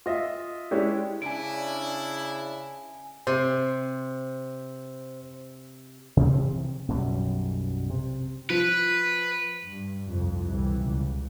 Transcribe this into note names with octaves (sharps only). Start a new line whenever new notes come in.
F4 D#5 E5
G#3 C#4 D4 E4 G4
C#3 D4 E4 G#5 D7
C3 C5
C3 E3 F3 C4
B1 F#2 B2 G3
C3
F3 B4
G2
C2 F2
G1 C2 B2 E3 G3
C#2 C#3